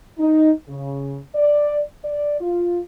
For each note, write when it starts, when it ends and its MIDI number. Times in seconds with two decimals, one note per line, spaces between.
0.18 0.51 63
0.68 1.17 49
1.34 1.80 74
2.04 2.40 74
2.41 2.78 65